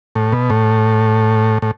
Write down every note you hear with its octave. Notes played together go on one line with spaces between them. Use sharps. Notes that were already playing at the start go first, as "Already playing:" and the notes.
A2
B2
A2
A2